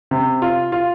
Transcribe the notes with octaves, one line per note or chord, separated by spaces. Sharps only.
C3
F4
F4